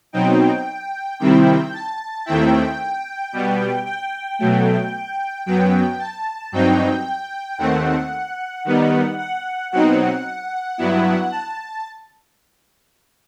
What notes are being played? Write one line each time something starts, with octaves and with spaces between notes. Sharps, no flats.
B2 F#3 C4 D#4 G5
C3 D#3 G3 C4 E4 G5
A5
D#2 D#3 A3 C4 E4 G5
B2 G3 B3
G5
B2 F#3 A3
F#2 F#3 B3 G5
A5
G2 F#3 C4 D#4 G5
D#2 D#3 A3 C4 F#5
D#3 G3 B3 D#4
F#5
B2 F#3 C4 D#4 F#5
G2 F#3 B3 E4
A5